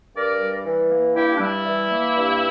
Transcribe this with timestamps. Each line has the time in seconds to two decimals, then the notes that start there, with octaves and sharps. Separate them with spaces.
0.15 G2 A#4 D5
0.39 G3
0.64 E3
0.90 A#3
1.14 G2 E4 G4
1.36 D4
1.39 G3 E4
1.65 E3
1.90 A#3
2.15 G2